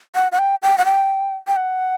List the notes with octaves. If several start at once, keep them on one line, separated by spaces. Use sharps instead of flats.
F#5
F#5
G5
G5
F#5
G5
G5
F#5